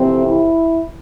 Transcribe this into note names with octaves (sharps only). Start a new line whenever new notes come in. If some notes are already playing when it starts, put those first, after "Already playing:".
Already playing: F2 C3 E3 A3 C4
E4